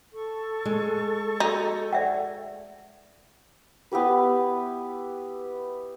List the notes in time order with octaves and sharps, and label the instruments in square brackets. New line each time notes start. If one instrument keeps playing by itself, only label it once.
[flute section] A4 C#6
[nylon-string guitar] G#3
[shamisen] D#4 [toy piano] F#4
[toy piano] D5 E5 F#5
[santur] B3 E4 G4 B4